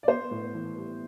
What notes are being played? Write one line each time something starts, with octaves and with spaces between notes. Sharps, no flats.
D5
B3 C5
A2
E3
G3